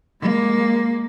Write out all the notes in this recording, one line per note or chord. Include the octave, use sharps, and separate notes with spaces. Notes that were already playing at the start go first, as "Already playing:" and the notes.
G#3 A#3